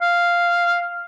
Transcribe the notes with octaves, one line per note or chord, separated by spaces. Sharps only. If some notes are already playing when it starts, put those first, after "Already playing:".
F5